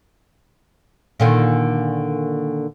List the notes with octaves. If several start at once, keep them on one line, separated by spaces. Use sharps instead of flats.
A#2 D3 D#3